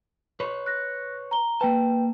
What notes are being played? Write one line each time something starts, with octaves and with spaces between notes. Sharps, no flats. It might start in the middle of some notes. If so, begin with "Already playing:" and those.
B4 C#5
F#6 A#6
A#5 G7
A#3 B4 G5 A5